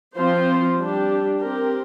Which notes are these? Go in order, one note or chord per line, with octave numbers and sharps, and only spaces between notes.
F3 C4 F4 C5
G3 D4 G4
C4 G4 A#4